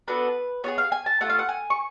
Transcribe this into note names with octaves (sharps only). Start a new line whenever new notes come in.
B3 D4 F#4 A4 B4
B3 F4 G#4 C#5
F5
G#5
A5
A3 F4 A4 F#5
F5
F#5
G#5
C#6